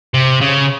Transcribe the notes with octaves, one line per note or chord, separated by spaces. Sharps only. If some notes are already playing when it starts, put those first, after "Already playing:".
C3
C#3